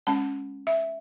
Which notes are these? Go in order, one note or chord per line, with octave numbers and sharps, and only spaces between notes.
G#3 C#4 A5
E5